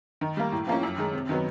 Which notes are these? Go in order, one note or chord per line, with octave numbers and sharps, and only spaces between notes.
D#3
G3 A#3
A2
F3 A#3 C#4
F#2
D#3 G#3
C3
D#3 F#3 B3